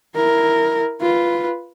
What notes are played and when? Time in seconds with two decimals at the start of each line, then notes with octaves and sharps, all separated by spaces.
0.15 E4 A#4
1.01 F4 B4